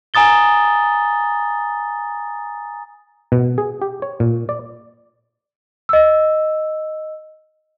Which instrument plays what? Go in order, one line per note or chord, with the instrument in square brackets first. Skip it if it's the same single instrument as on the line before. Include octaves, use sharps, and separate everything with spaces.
[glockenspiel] G#5 A#5 D#6 A6 G7
[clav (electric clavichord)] B2
G#4
G4
C#5
A#2
D5
[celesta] D#5 E6